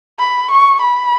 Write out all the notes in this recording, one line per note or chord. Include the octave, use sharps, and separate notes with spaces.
B5
C#6
B5